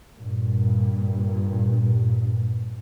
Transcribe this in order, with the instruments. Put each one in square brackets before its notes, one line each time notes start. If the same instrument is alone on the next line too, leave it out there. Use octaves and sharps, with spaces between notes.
[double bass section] G2 A#2